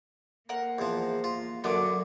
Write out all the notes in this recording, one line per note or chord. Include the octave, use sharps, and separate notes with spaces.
A#3 A#4 C5 F#5
E2 F3
F4
F#2 D3 F#3 B3 D6